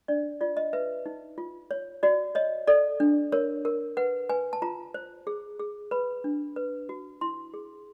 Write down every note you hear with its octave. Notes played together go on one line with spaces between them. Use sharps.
D4 D5
F4 D5
D#5
B4 E5
D#4
F4
C#5
F#4 D5
C#5 D#5
A4 D5
D4
A#4 C#5
A#4
B4 F#5
B4 G#5
A5
F4 A#5
C5
G#4
G#4
B4 B5
D4
B4
F#4
E4 C6
G#4